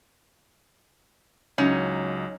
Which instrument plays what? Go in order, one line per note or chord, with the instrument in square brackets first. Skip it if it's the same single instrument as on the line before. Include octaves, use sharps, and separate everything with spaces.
[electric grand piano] C#2 F#3 [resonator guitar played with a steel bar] C#4 D#4